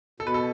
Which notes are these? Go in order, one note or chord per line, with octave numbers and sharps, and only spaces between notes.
B2 A4
B4
A4